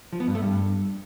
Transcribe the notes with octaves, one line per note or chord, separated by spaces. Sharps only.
F3
B3
G2
A3
G2